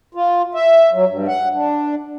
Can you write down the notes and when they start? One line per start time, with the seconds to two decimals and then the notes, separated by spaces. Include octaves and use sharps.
0.15 F4
0.55 E5
0.93 F#3
1.08 G2
1.28 F#5
1.54 D4